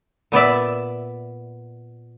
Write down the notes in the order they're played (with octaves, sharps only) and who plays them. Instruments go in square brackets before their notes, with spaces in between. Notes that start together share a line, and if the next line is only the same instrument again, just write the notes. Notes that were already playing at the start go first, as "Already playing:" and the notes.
[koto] A#2 B3 D5 E5